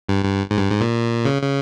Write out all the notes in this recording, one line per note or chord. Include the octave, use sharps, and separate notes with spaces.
G2
G2
G#2
G2
G#2
A#2
C#3
C#3